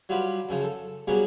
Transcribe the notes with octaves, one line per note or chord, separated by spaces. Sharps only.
F#3 G3 F4 G4 B4
F#2 C#3 F3
A4
F#3 G3 A#3 B3 C#4 G#4